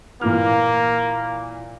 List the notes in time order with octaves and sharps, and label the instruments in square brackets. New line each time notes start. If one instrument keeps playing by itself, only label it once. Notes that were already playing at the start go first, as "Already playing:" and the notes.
[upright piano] A#2 E3 F6 [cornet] A#3